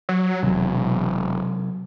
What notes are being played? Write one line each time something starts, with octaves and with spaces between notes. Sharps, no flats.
F#3
E1 C3 F#3